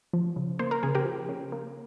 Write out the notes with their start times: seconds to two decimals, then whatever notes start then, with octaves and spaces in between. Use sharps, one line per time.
0.13 F3
0.36 C#3
0.59 A#3 C5
0.71 A#4
0.83 C#3 G#4
0.95 G4 A#4
1.05 F3
1.29 C#3
1.52 A#3